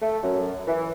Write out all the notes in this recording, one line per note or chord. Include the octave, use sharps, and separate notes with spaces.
A3
F#2
E3